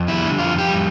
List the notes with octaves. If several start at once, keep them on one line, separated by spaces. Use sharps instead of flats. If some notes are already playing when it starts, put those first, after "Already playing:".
Already playing: F2
G3 E4
D3
F2 F4
F2 G4
G3